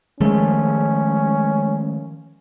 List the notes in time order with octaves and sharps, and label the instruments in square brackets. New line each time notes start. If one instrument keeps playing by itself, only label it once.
[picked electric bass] D#3 F3 A3 [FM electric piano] G#3 [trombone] C#4